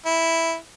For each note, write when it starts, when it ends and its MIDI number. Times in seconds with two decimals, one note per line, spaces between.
0.06 0.55 64